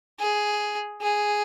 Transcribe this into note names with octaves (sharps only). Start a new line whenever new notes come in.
G#4
G#4